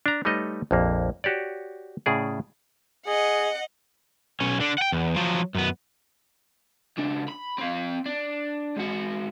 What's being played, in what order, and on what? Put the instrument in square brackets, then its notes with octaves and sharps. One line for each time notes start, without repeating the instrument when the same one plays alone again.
[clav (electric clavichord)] D4 A#5
G3 A3 D#4 B4 C#5 D#5
A#1 F2 A#3
F#4 G4 C#5 D5
A2 C#3 G#4 D5
[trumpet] G#4 [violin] D#5 F#5
[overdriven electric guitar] B1 C#4
D3 D4
F#5 G5
E2
F3 F#3
F#2 B3
C#2 D4
B5
C4 F5
D4
G#2 F#4